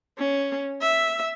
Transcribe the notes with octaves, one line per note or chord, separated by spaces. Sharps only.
C#4
E5